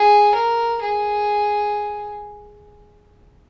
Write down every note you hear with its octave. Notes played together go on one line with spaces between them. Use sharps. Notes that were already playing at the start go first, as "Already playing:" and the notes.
Already playing: G#4
A#4
G#4